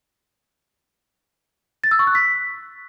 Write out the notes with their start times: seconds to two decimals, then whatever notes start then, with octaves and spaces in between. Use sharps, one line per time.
1.84 A6
1.91 E6
1.99 C#6
2.07 F#6
2.15 B6